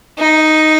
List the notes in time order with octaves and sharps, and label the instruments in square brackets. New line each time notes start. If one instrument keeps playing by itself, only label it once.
[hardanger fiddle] D#4